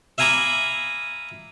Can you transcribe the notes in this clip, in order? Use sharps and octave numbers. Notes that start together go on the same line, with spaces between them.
E5 F5 G#5 A#5 B5 D6